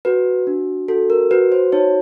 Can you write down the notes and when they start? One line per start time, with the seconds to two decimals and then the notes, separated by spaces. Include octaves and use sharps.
0.05 F#4 B4
0.47 D4
0.88 F#4 A4
1.10 A#4
1.31 F#4 B4
1.52 C5
1.72 D#4 C#5